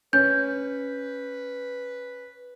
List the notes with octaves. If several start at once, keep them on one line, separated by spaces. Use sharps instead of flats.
C#4 B4 G6